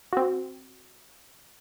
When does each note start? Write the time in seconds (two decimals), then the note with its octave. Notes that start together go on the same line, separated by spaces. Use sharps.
0.13 C4 F#4